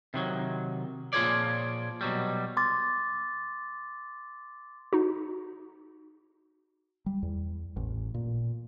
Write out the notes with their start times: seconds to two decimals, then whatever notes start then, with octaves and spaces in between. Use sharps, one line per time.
0.14 C3 D#3 F#3
1.13 A#2 F3 F4 G#4 C#5 D5
2.01 B2 F#3 G3
2.57 C6 D6 A6
4.93 D#4 F#4
7.06 G3
7.23 E2
7.77 A1
8.14 A#2